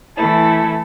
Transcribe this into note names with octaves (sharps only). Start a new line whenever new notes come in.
E3 A3 E4 A4